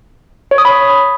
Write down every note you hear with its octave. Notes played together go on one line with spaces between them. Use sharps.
C#5
D#6
B5